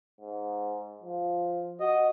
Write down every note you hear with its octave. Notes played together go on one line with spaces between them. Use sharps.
G#2
F3
F#4 D#5